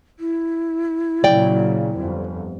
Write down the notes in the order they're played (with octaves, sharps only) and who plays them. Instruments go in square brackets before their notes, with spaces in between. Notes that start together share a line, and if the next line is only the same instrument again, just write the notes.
[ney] E4
[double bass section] A#2 C#3 F#3 [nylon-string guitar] D5 G5
[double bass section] G1 F2